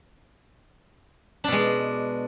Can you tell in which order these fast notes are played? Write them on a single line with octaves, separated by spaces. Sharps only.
D4 B2 G#3